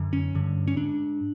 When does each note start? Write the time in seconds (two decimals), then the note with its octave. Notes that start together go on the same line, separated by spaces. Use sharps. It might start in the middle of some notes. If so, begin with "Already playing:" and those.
Already playing: F#2 D3
0.13 C#4
0.35 G2 D3
0.68 C#4
0.76 G#2 D4